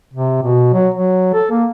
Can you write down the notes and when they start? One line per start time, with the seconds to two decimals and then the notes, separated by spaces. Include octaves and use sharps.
0.14 C3
0.42 B2
0.73 F#3
0.94 F#3
1.34 A4
1.51 A#3